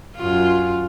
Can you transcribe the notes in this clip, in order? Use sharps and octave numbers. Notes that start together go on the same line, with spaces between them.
F#2 F4